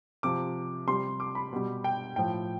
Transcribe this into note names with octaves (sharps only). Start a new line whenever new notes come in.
C3 F3 D6
C3 G3 C6
D6
B5
B2 G3
G5
A2 F3 G5